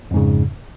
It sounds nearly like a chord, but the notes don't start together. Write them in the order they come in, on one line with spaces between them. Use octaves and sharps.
F2 G#2 C#3